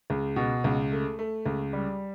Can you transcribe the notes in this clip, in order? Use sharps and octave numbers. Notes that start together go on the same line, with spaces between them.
C#2
B2
C#2
A3
A3
C#2
G3